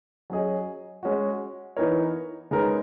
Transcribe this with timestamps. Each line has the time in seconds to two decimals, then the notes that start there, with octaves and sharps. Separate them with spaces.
0.30 F#3 C#4 G#4 D#5
1.03 G#3 C#4 F#4
1.76 E3 B3 D#4 A#4 C#5
2.51 C#3 G#3 B3 D#4 A#4